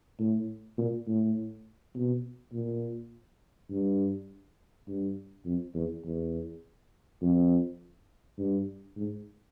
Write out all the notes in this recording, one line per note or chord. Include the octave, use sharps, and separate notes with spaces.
A2
A#2
A2
B2
A#2
G2
G2
F2
E2
E2
F2
G2
G#2